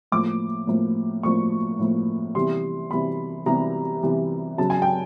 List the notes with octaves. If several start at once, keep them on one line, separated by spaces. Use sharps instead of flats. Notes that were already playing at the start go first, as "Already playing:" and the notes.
A2 F3 A#3 D6
A2 F3 A#3
A2 F3 A#3 C#6
A2 F3 A#3
C3 E3 G3 B3 C6
C3 E3 G3 B3 B5
C3 E3 G3 B3 A#5
C3 E3 G3 B3
C#3 F#3 B3 A5
G#5
G5